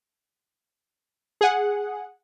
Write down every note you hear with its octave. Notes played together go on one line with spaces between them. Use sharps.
G#4 F#5